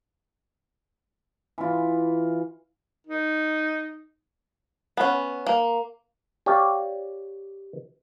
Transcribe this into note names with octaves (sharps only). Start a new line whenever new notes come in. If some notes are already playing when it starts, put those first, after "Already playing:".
E3 F4
D#4
B3 C#4
A#3
G4 C#5 D5 F5 G5